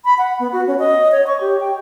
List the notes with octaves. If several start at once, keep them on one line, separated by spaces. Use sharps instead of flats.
B5
F#5
B3
F#4
C#4
D#5
C#5
C#6
G4
G5